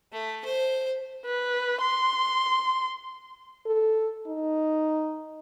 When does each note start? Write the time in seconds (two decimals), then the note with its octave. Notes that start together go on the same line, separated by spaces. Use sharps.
0.12 A3
0.45 C5
1.25 B4
1.81 C6
3.66 A4
4.27 D#4